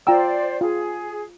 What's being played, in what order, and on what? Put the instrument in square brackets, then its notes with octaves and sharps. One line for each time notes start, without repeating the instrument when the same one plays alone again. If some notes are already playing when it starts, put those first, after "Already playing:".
[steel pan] F4 A#5 E6 [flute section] C5 D5 [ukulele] G5
[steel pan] F4 [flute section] G#4